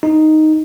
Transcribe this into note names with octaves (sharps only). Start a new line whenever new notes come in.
D#4